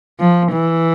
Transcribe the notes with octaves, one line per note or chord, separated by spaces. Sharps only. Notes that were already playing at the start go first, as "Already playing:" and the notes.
F3
E3